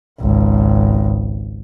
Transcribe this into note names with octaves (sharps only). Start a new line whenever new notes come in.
G#1 C#2